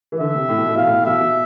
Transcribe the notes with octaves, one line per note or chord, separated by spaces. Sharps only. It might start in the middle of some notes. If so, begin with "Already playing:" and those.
E3
D3 E5
C3
A2
B2
A2
B2 F5
A2
A2
B2 E5
B2